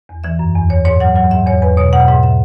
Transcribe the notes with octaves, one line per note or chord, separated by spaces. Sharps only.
E2
E3 E5
F#2
E2
E2 C#5
G#2 C#5
F#3 F#5
F#3 F#5
G#2 E5
E2 C#5
E2 B4
B2 C#5
B2 F#5
G#2 E5
E5